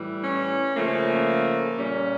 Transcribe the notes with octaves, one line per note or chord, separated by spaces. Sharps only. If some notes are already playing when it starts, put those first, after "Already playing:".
Already playing: A2 E3 G3
C#4
C#3 F3 A3 A#3
A#2 G3 C#4